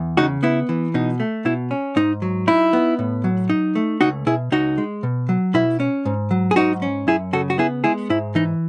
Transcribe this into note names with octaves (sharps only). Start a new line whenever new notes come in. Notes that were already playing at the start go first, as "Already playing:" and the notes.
Already playing: E2
C#3 D#4 F#4
B3 E4
E3
B2 D#4
A3
B2 E4
C#4
G#2 D#4
F#3
D#4 E4
B3
A2
F#3
D#4
A3
C#2 D#4 F#4
B2 E4 G#4
C#2 D#4 F#4
G#3
B2
F#3
B2 E4
C#4
G#2
F#3
G#4
G#2 D#4 F#4
C#4
F#2 E4 G#4
C#3 F#4 A4
F#4
B3 E4 G#4
G#3 E4 G#4
G#2 E4
E3 D#4